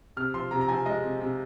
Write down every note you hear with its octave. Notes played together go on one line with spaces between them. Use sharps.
C3 F6
F3 C6
C3 A#5
A#5
F3 G#5
G#3 D#5
C3
C3